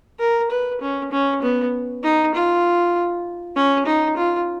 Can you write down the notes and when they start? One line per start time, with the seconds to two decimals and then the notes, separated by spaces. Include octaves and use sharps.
0.20 A#4
0.51 B4
0.81 C#4
1.12 C#4
1.42 B3
2.03 D#4
2.34 F4
3.56 C#4
3.86 D#4
4.17 F4